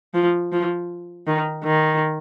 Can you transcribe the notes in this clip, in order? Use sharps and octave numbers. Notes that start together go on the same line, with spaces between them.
F3
F3
D#3
D#3